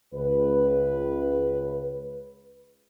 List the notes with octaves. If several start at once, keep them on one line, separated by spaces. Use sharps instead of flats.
C#2 B4